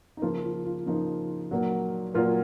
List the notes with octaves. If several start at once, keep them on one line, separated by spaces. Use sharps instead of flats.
D#4
C#3 F3 A#3 F4
F4
F4
C#3 F3 A#3 D#4
A#2 F#3 A#3
A#2 F#3 A#3 F4